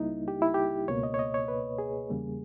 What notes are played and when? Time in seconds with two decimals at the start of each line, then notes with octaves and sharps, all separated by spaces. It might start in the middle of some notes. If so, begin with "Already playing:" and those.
Already playing: C#2 C#3 G3 A#3 D#4 E4
0.28 G4
0.42 E4
0.54 G4
0.88 C#2 B2 A#3 C#5
1.03 D#5
1.14 C#5
1.19 D#5
1.34 C#5
1.48 B4
1.78 G#4
2.09 E2 C#3 G3 A#3